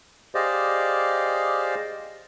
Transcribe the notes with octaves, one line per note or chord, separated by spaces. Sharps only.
G4 G#4 C5 D5 D#5 F5